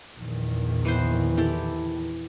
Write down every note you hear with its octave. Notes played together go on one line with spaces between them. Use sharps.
A#1 E2 D#3
E3 B3 C5
E4 G4 A4